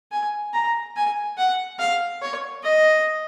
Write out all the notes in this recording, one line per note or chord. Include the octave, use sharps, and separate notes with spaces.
G#5
A#5
G#5
F#5
F5
C#5
D#5